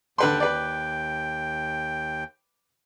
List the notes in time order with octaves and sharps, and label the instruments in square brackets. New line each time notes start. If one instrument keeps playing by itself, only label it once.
[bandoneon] D#2 G5 [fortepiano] D3 B4 C6
[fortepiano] B4 D5